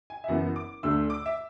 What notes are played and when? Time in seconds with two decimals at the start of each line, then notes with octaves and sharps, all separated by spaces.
0.10 G#5
0.24 E5
0.28 F#1 F#2 E3 B3 F#5
0.56 D6
0.83 D2 D3 A3 E6
1.10 D6
1.26 E5